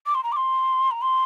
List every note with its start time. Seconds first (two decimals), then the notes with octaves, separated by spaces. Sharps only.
0.06 D6
0.15 C6
0.23 A#5
0.32 D6
0.36 C6
0.91 A#5
1.02 C6